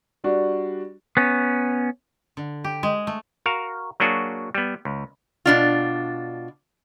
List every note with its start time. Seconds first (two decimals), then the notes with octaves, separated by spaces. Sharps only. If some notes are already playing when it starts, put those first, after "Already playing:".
0.24 G3 D4 F#4
1.17 B3 C#4
2.37 D3
2.64 G4
2.83 G#3
3.07 A3
3.46 F#4 A#4 F5
4.00 F#3 A#3 D4 F#4 G#4
4.55 G3 B3
4.85 C#2
5.46 B2 D4 F4